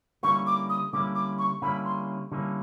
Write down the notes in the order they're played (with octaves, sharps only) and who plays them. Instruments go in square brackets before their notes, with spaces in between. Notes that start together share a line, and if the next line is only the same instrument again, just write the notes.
[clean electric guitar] D3 G3 A#3 C#4 E4 [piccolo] C#6
[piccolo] D6
D#6
[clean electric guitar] D3 G3 A#3 C#4 E4 [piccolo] D6
[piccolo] D6
C#6
[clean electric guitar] D3 G3 A#3 C#4 E4 [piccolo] B5
[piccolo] C6
[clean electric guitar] D3 G3 A#3 C#4 E4